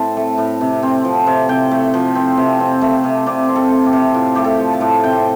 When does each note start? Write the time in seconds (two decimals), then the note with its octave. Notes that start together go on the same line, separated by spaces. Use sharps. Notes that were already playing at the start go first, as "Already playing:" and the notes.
Already playing: A2 C4 A5
0.17 A3
0.38 A2
0.61 C3
0.83 C4
1.05 F3
1.27 C3
1.49 C3 G5
1.71 A3
1.94 F3
2.15 C4
2.37 C3
2.60 C4
2.81 A3
3.04 C3
3.26 C3 D5
3.49 C4
3.55 A4
3.70 A3
3.86 G4
3.93 C3
4.14 A2 F4
4.35 A3 G4
4.44 A4
4.60 F3
4.73 A5
4.81 A2
5.04 C3 G5